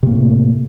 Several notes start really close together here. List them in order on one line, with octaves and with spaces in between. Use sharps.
C3 A#3 A2 A3